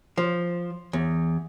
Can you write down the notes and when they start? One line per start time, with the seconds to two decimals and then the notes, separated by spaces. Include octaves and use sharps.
0.17 F3
0.93 E2